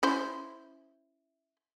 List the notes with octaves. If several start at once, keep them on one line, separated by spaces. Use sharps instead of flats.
C#4 E4 C5